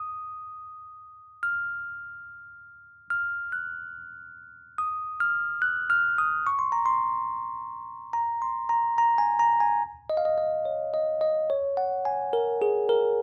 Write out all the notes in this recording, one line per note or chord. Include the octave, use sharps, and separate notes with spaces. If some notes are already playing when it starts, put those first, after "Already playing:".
Already playing: D#6
F6
F6
F#6
D#6
F6
F#6
F6
D#6
C#6
C6
A#5
C6
A#5
C6
A#5
A#5
G#5
A#5
G#5
D#5
F5
D#5
D#5
C#5
D#5
D#5
C#5
F#5
G#5
A#4
G#4
A#4